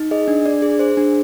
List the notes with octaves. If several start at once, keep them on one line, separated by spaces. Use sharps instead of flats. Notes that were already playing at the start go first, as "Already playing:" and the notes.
Already playing: D#4
G#4 D#5
D4
D4 D5
G#4
G#4 C5
D4